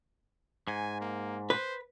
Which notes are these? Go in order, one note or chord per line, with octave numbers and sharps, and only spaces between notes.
G#2 G#5
A#3
B4 C5